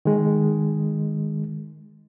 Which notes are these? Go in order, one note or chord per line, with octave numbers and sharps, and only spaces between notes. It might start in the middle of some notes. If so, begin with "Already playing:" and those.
D#3 G#3